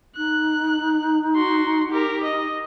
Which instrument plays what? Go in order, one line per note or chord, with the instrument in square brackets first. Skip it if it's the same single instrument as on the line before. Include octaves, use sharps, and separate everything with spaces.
[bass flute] D#4 [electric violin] F#6
[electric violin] F#4 C6
G4 A#4
D#5